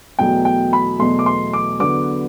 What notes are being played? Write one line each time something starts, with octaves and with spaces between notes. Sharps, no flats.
E2 B2 F#3 A3 G5
G5
B5
E2 B2 F#3 A3 C6
D6
C6
D6
E2 D3 F#3 B3 D6